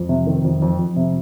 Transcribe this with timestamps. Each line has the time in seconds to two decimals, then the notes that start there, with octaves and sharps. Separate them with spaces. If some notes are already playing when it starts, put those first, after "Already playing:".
Already playing: F2
0.09 C3
0.27 D#3
0.44 F2
0.62 F2
0.79 F2
0.96 C3